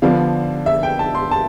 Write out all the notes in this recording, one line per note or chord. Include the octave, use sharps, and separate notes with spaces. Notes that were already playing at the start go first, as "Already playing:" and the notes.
D3 F3 B3 D4 F5
E5
G5
A5
C6
A5